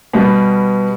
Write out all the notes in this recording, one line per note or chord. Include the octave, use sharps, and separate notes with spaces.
B2 G3 B3